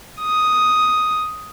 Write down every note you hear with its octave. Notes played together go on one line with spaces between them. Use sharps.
D#6